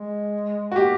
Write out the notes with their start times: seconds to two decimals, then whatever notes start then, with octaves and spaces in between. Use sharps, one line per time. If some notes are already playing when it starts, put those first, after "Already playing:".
Already playing: G#3
0.72 F#4
0.76 A#3 G4